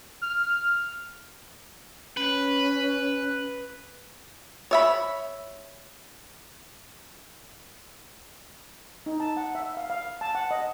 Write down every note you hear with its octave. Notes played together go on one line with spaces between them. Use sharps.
F6
C#4 B4
C#5 E5 B5
D#4
A5
F#5
E5
F5
F5
A5
F#5
D#5